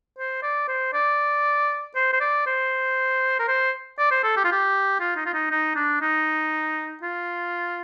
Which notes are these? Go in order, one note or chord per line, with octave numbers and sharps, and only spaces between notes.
C5
D5
C5
D5
C5
C5
D5
C5
A#4
C5
D5
C5
A4
G4
F4
G4
F4
D#4
F4
D#4
D#4
D4
D#4
F4